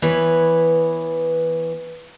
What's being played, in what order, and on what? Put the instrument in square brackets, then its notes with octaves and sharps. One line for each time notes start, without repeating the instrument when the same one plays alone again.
[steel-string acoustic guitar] E3 B3 B4 C#5